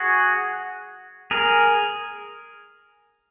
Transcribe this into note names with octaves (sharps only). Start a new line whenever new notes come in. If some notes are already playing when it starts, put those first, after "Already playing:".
Already playing: F#4 G#4
G#4 A#4